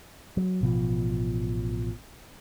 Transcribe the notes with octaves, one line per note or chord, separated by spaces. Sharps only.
F#3
A1 B2 F3